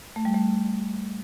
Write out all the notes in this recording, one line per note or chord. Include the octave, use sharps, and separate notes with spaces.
A3
G3
A3